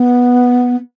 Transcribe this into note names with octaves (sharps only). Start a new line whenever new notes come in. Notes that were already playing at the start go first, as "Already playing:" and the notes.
Already playing: B3